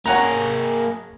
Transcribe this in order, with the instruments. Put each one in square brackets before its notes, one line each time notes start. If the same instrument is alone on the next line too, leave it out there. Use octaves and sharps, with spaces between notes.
[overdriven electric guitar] A#3 G#4 [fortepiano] C#5 F#5 A#5